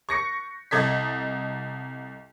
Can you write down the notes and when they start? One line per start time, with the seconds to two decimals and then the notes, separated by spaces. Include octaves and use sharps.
0.09 C#6 A#6 C#7
0.71 C2 A4 D#5 G#6 B6